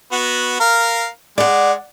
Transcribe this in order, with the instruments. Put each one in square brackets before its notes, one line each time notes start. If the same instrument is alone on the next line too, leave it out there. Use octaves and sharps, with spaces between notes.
[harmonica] B3 F#4
A#4 F5
[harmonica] G#3 [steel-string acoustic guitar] D5 F#5